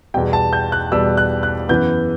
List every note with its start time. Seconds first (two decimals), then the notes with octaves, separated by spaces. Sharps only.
0.14 E2 B2 G3 G5
0.33 A5
0.53 G6
0.72 F#6
0.92 E2 B2 G3 E6
1.17 F#6
1.43 F#6
1.69 F#2 E3 B3 G6